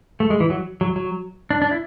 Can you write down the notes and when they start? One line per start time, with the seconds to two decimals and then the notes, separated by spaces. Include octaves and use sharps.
0.20 A3
0.30 G#3
0.40 E3
0.50 F#3
0.81 F#3
0.96 F#3
1.51 D4
1.62 D4
1.71 E4